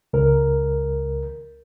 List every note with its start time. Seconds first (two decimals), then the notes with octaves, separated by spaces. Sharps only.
0.13 C#2 A#4